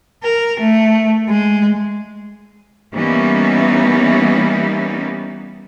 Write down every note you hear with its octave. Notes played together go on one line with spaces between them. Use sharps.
A#4
A3
G#3
E3 G3 A#3 B3 C#4 D#4